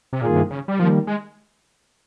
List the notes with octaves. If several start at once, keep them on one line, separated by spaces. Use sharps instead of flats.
C3
G2 A#2 D#3 A#3 F4 G#4
C3
C#3
G3
D#3 F3 G3 A#3
G#3